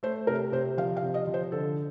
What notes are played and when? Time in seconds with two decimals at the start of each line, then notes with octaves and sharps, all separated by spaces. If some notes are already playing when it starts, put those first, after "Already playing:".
0.03 A3 C5
0.27 C3 A#4
0.52 C3 C5
0.78 F3 F5
0.97 F5
1.02 C3
1.14 D#5
1.27 F3
1.34 C5
1.52 D3 A4